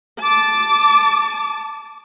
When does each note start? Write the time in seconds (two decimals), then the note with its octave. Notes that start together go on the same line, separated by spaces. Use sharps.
0.20 A5 D6